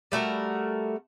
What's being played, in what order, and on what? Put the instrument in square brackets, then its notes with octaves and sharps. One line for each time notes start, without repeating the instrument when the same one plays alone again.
[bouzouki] G3 A3 F#4 A#4